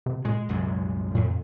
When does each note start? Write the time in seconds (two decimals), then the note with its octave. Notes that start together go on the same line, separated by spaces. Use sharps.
0.06 C3
0.25 A#2 G#3
0.49 C2 F#2 G#3
1.15 F2 A#2